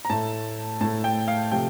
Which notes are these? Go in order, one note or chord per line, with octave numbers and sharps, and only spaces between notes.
A#5
A2 A3 A5
A2 A3 A5
G5
F5
C3 F3 A3 G5